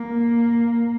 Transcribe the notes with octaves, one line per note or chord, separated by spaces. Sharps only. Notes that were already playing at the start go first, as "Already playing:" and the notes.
Already playing: A#3